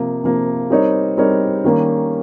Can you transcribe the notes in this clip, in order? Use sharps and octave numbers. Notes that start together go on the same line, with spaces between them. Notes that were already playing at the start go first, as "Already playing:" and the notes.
Already playing: C3 F3 A#3
C3 F3 A#3
G3 C4 D#4 A#4 C#5
G3 C4 D#4 A#4 C#5
D#3 G3 A#3 C#4